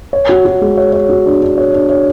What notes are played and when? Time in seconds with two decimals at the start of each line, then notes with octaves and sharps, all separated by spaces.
0.13 C#5
0.29 F#4
0.45 F#4
0.61 G#3
0.77 C#5
0.93 C#5
1.09 F#4
1.26 D4
1.42 D4
1.58 C#5
1.74 D4
1.90 C#5